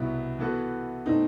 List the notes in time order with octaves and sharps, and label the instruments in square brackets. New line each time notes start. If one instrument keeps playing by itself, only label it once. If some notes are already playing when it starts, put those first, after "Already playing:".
Already playing: [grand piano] C2 B2 F#3 B3 [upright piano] E4
[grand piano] E3 B3 F#4 A4
[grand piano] B2 A3 C4 [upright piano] D#4